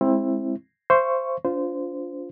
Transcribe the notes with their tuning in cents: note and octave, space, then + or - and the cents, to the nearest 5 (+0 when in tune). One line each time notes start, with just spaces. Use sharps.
G#3 +0 C4 +20 E4 +0
C5 +0 E5 +45 C#6 +0
D4 -45 F4 +0 C5 -20